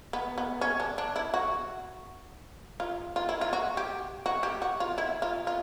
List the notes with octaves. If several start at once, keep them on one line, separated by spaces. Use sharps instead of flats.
B3
B3
C#4
D4
D4
E4
F#4
F4
F4
E4
F4
F#4
G4
F#4
G4
F#4
F4
E4
F4
F4